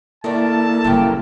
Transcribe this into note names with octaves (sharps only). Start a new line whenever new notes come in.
D#3 A3 A#3 D4 E4 A4 A5
F#1 A#2 C#3 G3 G4